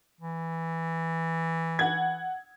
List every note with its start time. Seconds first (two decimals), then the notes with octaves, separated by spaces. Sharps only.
0.21 E3
1.79 F#5 G#6